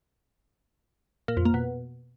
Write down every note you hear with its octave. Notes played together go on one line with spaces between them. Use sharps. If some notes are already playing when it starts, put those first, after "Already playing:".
A#2
F2
A#3
B2